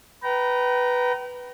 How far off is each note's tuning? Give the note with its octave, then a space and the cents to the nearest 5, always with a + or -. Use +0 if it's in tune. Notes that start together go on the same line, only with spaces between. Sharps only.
B4 +0 G5 -35 A#5 +0